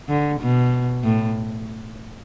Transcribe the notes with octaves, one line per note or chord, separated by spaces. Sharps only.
D3
B2
A2